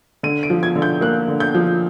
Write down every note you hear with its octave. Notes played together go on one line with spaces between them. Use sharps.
D3 D#7
D7
F3
G#6
D3
G6
A#3 F#6
D3
G6
F3